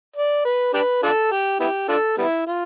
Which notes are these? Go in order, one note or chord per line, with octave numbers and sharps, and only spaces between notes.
D5
B4
D4 G4 B4
D4 F4 A4
G4
B3 E4 G4
D4 F4 A4
G3 B3 E4
F4